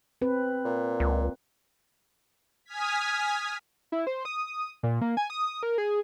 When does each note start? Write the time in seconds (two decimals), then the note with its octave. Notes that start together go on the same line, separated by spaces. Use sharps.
0.22 C4 B4
0.65 A#2
1.00 C#2
2.65 G#5 D#6 F6 G#6 B6
3.92 E4
4.07 C5
4.25 D#6
4.83 A#2
5.01 A#3
5.17 G#5
5.30 D#6
5.63 A#4
5.78 G#4